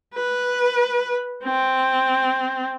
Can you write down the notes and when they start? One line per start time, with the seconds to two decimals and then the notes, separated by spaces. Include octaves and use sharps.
0.14 B4
1.44 C4